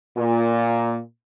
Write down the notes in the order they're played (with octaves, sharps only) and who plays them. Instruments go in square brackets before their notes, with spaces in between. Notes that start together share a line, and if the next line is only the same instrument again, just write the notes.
[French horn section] A#2